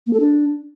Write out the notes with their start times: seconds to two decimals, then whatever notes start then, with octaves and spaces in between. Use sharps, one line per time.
0.07 A#3
0.13 A4
0.20 D4